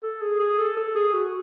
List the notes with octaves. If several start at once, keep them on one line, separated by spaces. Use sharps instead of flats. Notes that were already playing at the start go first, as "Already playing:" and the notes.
A4
G#4
G#4
A4
A4
G#4
F#4